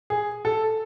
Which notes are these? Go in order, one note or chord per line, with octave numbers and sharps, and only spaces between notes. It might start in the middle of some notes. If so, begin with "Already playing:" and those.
G#4
A4